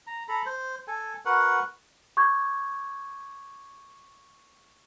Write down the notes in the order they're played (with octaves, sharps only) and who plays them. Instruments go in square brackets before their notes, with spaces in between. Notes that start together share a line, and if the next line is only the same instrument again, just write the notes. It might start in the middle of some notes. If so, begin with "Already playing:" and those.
[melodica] A#5
A4 A#5 B5
C5
A4 G#5
F#4 A#4 B4 F#5
[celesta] C#6 D6 G6 G#6